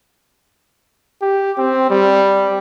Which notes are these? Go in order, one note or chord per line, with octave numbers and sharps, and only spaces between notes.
G4
C4
G3